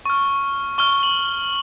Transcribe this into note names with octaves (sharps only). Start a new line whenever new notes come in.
C#6 F6
C#6 F6 G7
F#7